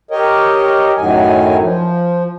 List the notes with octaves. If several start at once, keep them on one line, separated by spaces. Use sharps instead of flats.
G4 A#4 C#5 D#5
F#2 A2 D#3 F#3 G#5
F3